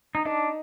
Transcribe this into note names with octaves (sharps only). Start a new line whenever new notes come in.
D#4
D4 D#4